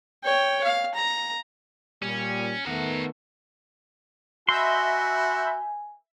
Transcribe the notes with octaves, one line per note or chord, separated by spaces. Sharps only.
C#5 G5
F5
A#5
A#2 G3 C#4
D#3 A3 B3 A#4 F#5
F#4 D#5 E5 G#5 B5 C6 G6